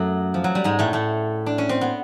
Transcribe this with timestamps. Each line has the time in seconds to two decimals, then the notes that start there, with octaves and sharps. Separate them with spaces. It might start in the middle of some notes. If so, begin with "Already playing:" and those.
Already playing: F#2 F#3 A3
0.34 F3
0.44 F#3
0.55 G3
0.64 G#2 G#3
0.79 A2 A3
0.93 A2 A3
1.46 D4
1.58 C#4
1.69 C4
1.81 B3